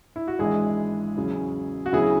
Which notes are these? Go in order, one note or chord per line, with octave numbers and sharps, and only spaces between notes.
E4
F#4
G#1 G#2 E3 G#3 D4 E4 G#4
E2 C#3 F#3 C#4
F#4
D2 C#3 F#3 B3 E4 G#4